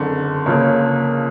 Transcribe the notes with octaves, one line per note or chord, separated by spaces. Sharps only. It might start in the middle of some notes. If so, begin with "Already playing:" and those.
Already playing: F#1 F2 D3
C#2 C#3 F3 A#3 C#4